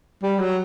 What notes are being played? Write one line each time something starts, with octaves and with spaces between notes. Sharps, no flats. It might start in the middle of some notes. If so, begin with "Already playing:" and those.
G3
F#3